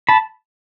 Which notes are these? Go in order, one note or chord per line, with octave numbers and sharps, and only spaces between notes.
A5 B5